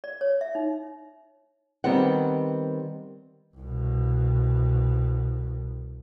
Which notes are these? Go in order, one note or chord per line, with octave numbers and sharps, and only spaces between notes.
D5
C#5
E5
D#4
D#3 G3 B3 C4 F#5
C2 B2